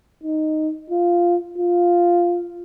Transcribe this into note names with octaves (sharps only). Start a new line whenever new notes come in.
D#4
F4
F4